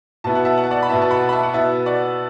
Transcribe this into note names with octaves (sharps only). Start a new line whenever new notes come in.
B2 B3 E4 A5
F#5
E5 A5
F#5
A5
D5 F#5
B5
B2 B3 E4 E5 A5
A5
F#5 B5
B5
E5 A5
F#5
B2 B3 E4 E5 A5
D5 F#5